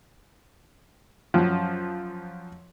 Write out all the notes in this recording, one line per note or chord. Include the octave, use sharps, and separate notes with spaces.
F#2 F3